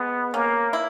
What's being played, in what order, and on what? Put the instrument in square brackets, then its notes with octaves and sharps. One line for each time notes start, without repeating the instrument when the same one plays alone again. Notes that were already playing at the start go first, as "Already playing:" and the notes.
Already playing: [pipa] G#3 [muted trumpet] B3
[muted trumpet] A#3 [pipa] C#4
[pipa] E4